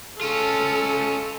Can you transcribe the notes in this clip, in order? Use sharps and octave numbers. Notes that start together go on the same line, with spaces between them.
C#4 F4 A4